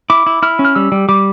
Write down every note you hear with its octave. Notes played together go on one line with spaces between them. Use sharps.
E4 D6
E4
E4 F6
C#4
F6
G3 E6
G3
G3 D6